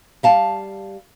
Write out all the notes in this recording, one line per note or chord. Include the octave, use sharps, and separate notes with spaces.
G3 F5 A5